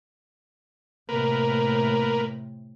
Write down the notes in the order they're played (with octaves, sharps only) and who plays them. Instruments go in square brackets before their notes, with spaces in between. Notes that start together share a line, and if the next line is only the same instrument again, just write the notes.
[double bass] A2 C3 [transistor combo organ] A#3 A#4 B4